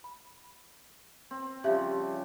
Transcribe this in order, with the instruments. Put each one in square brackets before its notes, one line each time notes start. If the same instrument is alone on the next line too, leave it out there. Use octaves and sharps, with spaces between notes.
[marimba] B5
[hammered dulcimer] C4
[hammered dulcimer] C#3 F3 G3 [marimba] G4 E5